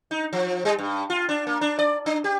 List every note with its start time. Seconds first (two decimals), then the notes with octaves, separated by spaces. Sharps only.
0.11 D#4
0.33 F3
0.65 G3
0.79 G2
1.10 F4
1.29 D4
1.47 A#3
1.61 D4
1.79 D5
2.06 D4
2.24 G4